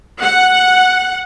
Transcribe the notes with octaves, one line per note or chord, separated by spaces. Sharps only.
F#5